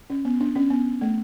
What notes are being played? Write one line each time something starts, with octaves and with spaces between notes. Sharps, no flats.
C#4
B3
D4
C#4
B3
A3